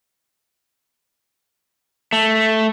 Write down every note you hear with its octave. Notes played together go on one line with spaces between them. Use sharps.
A3